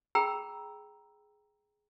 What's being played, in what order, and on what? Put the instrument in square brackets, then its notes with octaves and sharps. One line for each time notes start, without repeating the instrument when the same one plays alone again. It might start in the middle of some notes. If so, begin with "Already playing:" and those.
[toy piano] G#4 G5 A#5 B5 E6